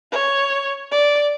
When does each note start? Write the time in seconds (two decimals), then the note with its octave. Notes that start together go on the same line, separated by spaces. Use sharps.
0.12 C#5
0.91 D5